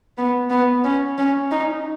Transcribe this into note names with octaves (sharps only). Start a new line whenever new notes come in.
B3
B3
C#4
C#4
D#4